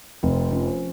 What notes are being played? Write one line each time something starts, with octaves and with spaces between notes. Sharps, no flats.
F1 C4
F3 C#4